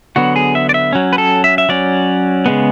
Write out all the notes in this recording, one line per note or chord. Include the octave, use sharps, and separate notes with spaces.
D3 F#3 B3 F#4
G#4
E5
D5
E5
F#3 C#4
B4
A4
E5
E5
F#3 C#4 D5
C#3 G#3 B3